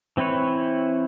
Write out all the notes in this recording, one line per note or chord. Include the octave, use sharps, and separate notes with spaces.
E3 C4 E4 B4 C#5